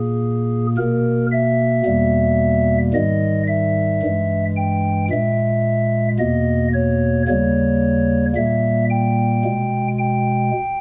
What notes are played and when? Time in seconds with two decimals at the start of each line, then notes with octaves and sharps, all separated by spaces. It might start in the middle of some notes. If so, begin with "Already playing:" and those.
Already playing: A#2 A#3 G#4
0.77 B2 A#3 A#4
1.32 E5
1.85 E2 B2 G3 A#3
2.94 G#2 D#3 G3 D#5
3.47 E5
4.02 G2 E3 G#3
4.56 G5
5.10 A#2 G#3 E5
6.19 E2 B2 A#3 D#5
6.73 C#5
7.27 D#2 C#3 G3 A#3 C#5
8.36 A#2 G3 A#3 E5
8.90 G5
9.45 B2 G#3
9.98 G5